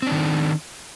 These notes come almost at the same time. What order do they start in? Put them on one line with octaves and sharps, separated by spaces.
C4 D4 D#3